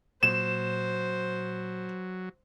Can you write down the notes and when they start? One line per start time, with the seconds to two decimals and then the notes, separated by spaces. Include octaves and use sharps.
0.23 A#2 F#3 C5 E7